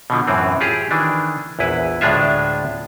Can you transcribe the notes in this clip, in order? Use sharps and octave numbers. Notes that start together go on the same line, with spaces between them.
B2 D3 F3
F#2 A2 E3 C4
F4 G4 G#4
D#3 E3 D4
A#1 E2 E4 B4
D2 A2 G#3 D4 F4 E5